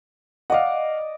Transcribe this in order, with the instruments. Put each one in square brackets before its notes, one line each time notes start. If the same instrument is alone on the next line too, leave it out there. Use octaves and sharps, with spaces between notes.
[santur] D5 D#5 [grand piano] F5 F#5